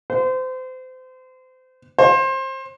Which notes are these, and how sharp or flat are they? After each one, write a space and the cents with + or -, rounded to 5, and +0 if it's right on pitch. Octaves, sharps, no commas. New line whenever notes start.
C5 -30
C5 +25